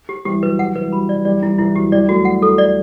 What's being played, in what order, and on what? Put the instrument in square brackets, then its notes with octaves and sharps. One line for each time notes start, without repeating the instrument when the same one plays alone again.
[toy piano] G4
[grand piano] E3 G3 [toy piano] G4
[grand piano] F#3 [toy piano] B4
[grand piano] F#3 [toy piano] F#5
[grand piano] E3 [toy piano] B4
[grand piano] G3
[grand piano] F#3 [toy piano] B5
[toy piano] D5
[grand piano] F#3
[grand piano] E3 G3 [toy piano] D5
[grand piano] E3 G3 [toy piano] E4
[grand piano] E3 [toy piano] E4
[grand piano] F#3 [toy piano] G4
[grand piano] E3 G3 [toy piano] D5
[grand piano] F#3 A3 [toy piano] F#4
[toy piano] F#5
A4
D5